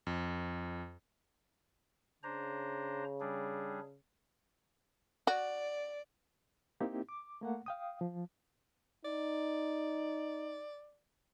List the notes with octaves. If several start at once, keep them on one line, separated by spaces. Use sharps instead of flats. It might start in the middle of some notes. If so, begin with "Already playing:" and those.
F2
C#3 D4 C5 A#5
G3 D4 G#4
F#4 D5
A#3 C4 D#4 E4 G4
D6
A3 A#3 F#5
F5 G5 D#6
F3
D#4 D5